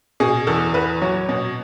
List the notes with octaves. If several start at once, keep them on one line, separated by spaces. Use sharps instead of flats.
B2 G#4
E2 A4
E2 B4
F#3 C#5
B2